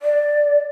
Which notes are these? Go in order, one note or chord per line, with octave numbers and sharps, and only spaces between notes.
D5